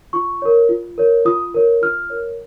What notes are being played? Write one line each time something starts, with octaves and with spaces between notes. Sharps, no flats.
F4 C#6
A#4 C#5
F4
A#4 C#5
F4 D#6
A#4 C#5
F4 F6
A#4 C#5